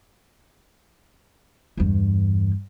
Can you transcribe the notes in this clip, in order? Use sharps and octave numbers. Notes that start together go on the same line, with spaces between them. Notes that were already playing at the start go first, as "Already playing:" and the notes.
E2 G2